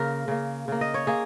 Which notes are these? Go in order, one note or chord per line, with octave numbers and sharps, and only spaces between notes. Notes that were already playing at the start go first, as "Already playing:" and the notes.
Already playing: C#3 A#3 A#4
C#3 A#3
C#3 A#3
D#5
C#5
A#3 G#4